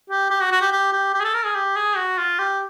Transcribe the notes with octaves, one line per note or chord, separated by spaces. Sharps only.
G4
G4
F#4
F#4
G4
G4
G4
G4
G#4
A4
A#4
G#4
G4
G#4
F#4
F4
G4